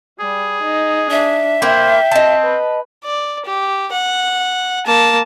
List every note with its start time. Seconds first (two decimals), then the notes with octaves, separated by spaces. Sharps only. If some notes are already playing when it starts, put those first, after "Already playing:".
0.20 G3 G#4
0.62 D#4
1.11 D4 E5
1.62 A#3 E4 C5 G5
2.11 C4 D#5 A5
2.43 B4
3.04 D5
3.45 G4
3.92 F#5
4.86 A#3 A5